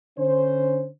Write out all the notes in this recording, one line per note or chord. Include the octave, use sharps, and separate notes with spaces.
D3 C#4 C5